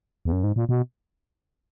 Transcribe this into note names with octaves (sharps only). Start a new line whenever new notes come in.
E2
F#2
G#2
A#2
B2